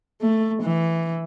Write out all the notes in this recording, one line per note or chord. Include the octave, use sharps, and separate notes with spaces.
A3
E3